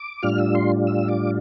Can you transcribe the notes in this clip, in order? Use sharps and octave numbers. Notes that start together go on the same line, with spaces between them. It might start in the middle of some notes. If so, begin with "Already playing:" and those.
Already playing: D6
A2 G3 D4 F4 F6
E6
C6
E6
D6